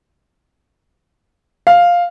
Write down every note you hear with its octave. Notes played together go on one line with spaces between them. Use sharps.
F5